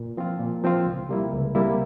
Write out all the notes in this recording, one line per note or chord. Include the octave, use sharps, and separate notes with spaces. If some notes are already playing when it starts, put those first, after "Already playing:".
Already playing: A#2
F3 C4 F4
A#2
F3 C4 F4
C#2
C3 G3 A#3 E4
C#2
C3 G3 A#3 E4